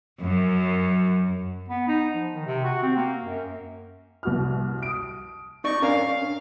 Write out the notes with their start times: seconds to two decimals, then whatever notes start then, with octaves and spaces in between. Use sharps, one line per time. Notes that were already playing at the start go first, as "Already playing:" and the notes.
0.21 F#2
1.69 B3
1.87 D#4
2.14 F3
2.34 D#3
2.46 C3
2.64 F#4
2.82 C4
2.96 A#3
3.23 F#2
4.23 C2 F#4 F6
4.83 D#6 D7
5.64 D#4 D5 D#5 C#6
5.82 C#4 D4 A#4 F5